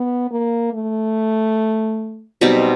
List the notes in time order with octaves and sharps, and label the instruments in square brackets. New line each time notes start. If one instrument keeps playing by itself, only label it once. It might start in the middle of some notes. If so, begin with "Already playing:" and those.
Already playing: [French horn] B3
A#3
A3
[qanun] B2 G3 C4 D#4 [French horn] F#3